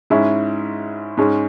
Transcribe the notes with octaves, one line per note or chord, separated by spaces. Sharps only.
G#2 G#3 C#4 E4
G#2 G#3 C#4